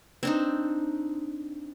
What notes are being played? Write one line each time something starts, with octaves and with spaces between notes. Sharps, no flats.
C4 D4 D#4